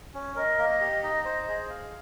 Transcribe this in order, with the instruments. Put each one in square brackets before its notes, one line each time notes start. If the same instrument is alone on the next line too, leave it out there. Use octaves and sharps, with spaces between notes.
[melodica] C#4
[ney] C#5
[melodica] A#4 [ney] D#5
[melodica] A#3
G4
D#4
C5
G#4
F5